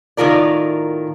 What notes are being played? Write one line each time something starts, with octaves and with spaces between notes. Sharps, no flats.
A2 D#3 F4 A#4 D5